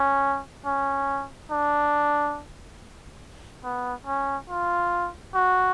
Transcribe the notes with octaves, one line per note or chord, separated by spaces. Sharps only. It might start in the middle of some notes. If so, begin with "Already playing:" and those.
Already playing: C#4
C#4
D4
B3
C#4
F4
F#4